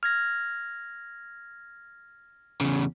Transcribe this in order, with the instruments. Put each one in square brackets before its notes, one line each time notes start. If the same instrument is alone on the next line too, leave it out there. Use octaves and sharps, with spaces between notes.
[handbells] F6 G#6 A#6
[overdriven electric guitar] E2 C#3